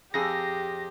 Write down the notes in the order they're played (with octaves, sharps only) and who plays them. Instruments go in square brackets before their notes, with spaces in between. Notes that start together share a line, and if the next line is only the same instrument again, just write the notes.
[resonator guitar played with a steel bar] F2 G#4 [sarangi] G4 [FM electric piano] A#6